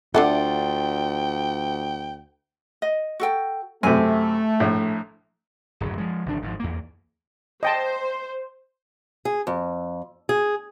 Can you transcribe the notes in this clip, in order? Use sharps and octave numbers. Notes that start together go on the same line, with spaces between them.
D2 D4 F4 A4 D5 E5 F#5 G5
D#5
F#4 A4 G5
F#2 C3 A3 G#5
A#1 A2
D1 F#2 C#3
F3 G#3
G1 C#3 F3 D4
G#1 G#2 E3 F3
E2 A#3
C5 D#5 G5 A5
G#4
F2
G#4